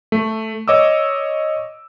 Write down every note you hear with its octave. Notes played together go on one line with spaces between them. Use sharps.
A3
C#5 D#5 D6 E6